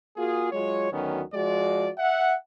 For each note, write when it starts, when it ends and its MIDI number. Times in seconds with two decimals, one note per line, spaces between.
0.16 0.52 58
0.16 0.52 65
0.16 0.52 66
0.16 0.52 68
0.52 0.88 54
0.52 0.88 56
0.52 0.88 65
0.52 0.88 73
0.91 1.20 38
0.91 1.20 51
0.91 1.20 54
0.91 1.20 59
0.91 1.20 61
1.33 1.89 53
1.33 1.89 56
1.33 1.89 66
1.33 1.89 74
1.97 2.33 76
1.97 2.33 78